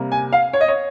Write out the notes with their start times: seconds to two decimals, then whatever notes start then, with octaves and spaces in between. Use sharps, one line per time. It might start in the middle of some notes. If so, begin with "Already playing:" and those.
Already playing: C3 G3 A#3
0.12 G#5
0.33 F5
0.53 C#5
0.61 D#5
0.68 C#5